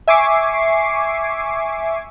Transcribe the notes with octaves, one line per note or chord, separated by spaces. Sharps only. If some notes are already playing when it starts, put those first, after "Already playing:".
E5 G#5 C#6 D6 C7